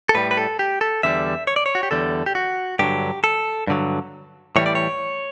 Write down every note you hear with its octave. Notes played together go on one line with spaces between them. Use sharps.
A4
A2 G3 B4
B4
A4
G4
A4
E2 D3 G3 E5
C#5
D5
C#5
F#4
G4
E2 D3 G3 A4
G4
F#4
G2 D3 F#3 G4
A4
G2 D3 F#3
A2 E3 G3 C#5
D5
C#5